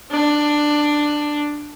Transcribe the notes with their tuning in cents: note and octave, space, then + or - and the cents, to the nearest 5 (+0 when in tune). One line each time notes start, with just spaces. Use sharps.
D4 +10